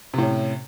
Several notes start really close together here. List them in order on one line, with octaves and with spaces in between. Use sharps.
C3 A2 C#4